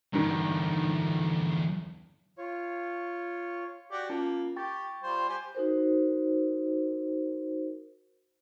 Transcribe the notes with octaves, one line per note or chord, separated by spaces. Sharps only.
E2 G2 D3 D#3
F4 C#5
F#4 G4 D5
A#3 C#4 F4 A5
G4 G5 C#6 A6
G3 F4 C5
G4 C5 G#5
D#4 F#4 A#4 C5